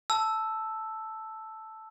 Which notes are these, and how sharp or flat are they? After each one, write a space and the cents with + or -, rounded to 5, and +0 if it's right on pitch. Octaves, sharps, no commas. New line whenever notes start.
A5 +0 E6 +0